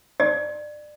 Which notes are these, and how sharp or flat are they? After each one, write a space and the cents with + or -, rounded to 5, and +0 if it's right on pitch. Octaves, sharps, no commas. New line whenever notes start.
D5 +25